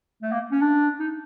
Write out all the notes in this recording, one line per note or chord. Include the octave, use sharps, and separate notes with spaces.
A3
A#3
C#4
D4
D#4